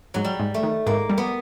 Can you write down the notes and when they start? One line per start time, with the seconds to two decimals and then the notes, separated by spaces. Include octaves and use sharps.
0.14 G#2 F#3
0.24 G3
0.39 G#2
0.54 A3
0.63 D#3
0.86 G#2 A#3
1.10 G3
1.18 B3